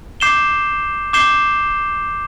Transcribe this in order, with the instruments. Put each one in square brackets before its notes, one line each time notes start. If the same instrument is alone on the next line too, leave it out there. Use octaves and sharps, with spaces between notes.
[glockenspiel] D6 G6 C7 E7 G7
D6 G6 C7 E7 G7